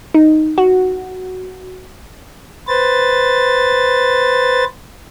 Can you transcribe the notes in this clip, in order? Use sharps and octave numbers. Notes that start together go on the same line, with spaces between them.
D#4
F#4
B4 C5 A6